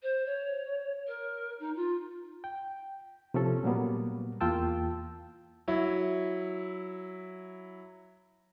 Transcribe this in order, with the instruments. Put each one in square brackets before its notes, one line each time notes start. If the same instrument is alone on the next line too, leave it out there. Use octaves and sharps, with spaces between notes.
[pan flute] C5
C#5
A#4
D#4
F4
[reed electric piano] G5
C3 F3 C#4 A4
A#2 F#3 G3 A#3 B3
E2 A#3 F4 G5 A5 E6
[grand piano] F#3 E4